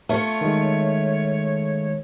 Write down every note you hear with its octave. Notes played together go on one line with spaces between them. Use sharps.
A3 F4 C#5
D#3 G#3